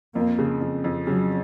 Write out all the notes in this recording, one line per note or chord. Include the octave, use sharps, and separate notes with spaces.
F2 A#3
C#3
F2
F2
C#3 F#3